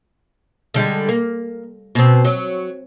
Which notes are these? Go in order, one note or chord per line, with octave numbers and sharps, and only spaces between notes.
D3 G3 G#3
A#3
B2 C4
F#3